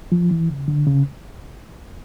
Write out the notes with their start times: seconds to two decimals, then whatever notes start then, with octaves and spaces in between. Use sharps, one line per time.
0.12 F3
0.31 E3
0.50 C#3
0.68 D3
0.87 C#3